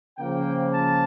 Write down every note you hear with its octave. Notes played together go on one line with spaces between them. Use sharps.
C#3 F3 A#3 G5
A5